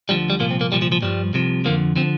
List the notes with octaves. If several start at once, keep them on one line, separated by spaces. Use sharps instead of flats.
D2 D3 F3 G3
G3
C2 A#2 F3 A#3
C4
A#3
C2 A#2 F3 G3
F3
F3
G2 F3 G3
C2 C3 F3
F2 D3 F3 A#3
D3 F3 C4